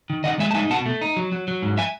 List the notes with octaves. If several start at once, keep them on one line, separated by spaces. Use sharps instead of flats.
D#3
D#3 D#5 F#5
G#3 E5 G#5
A5
D#4 E5 G#5
B2 F#5 A5
A3
D#4
F#3
F#3
F#3
G#2
E5 G#5